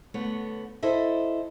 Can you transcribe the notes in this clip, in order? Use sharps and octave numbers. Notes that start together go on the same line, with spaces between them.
D3 A3 B3 C#5
E4 A4 C5 D#5 E5